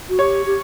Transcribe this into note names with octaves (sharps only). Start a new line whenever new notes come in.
F#4
G4 C#5
G4